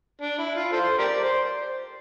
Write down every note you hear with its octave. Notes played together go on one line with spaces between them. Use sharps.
D4
E4
F4
F4 A4 C5
G4 A#4 D5
C5